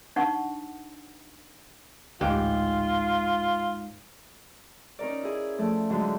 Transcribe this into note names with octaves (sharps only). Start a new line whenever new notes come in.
D4 D#4 F#5 C#6
A1 D2 G#2 F4 G4
C#4 D#4 A#4 D5
E4 G#4
F3 A3 D5 E5
G#2 D3 F#3 D4